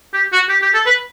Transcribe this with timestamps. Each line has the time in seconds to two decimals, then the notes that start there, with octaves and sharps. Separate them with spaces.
0.14 G4
0.32 F#4
0.49 G4
0.62 G4
0.74 A4
0.86 B4